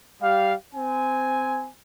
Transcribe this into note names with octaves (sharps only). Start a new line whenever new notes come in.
G3 G4 F5
C4 G#5